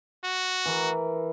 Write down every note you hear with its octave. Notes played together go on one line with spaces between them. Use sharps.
F#4
E3 A#4